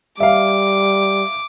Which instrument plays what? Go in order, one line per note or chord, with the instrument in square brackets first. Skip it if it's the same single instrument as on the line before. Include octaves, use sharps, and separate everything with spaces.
[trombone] G3 [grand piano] E5 F5 [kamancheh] D6